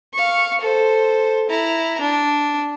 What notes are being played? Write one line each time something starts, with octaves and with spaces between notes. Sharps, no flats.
F5 C#6
A4 C5
E4 A#5
D4